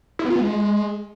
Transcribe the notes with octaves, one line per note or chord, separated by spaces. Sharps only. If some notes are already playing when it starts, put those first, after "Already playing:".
E4
B3
F4
B3
G#3